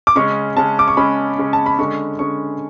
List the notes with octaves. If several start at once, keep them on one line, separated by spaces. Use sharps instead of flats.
D6
C#3 G#3 C#4 C#6
C#3 G#3 C#4 A5
D6
C#6
C#3 G#3 C#4 B5
C#3 G#3 C#4
A5
B5
D3 G#3 C#4 C#6
D3 G#3 C#4 C#6